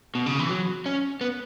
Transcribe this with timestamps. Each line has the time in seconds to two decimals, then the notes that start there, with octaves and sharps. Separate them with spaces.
0.15 B2
0.26 C#3
0.39 E3
0.50 F#3
0.86 C#4
1.21 B3